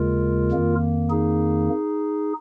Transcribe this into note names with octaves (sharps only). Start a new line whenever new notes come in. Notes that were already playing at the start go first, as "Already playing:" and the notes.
Already playing: D#2 C#3 G#3 F4 A#4
F2 D#3 A#3
D#4 G#4